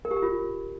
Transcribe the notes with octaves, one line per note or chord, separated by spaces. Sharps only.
A#4
G4
A#4
F4